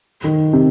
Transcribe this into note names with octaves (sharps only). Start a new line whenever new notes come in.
D#3
C3